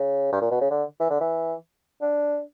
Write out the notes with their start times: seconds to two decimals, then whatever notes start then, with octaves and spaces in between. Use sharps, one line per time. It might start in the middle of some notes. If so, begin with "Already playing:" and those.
Already playing: C#3
0.33 G2
0.41 A#2
0.51 B2
0.61 C#3
0.71 D3
1.00 E3
1.10 D3
1.21 E3
2.02 D4